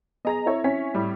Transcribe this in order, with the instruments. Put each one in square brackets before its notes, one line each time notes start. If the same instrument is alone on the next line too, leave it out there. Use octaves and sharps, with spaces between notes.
[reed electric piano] B3 G#4 [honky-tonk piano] D#5 A#5 A#6
[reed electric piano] C4 E4 E5 [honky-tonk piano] A4 C#5 A#5
[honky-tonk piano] C#4 C#5 B6
A2 G3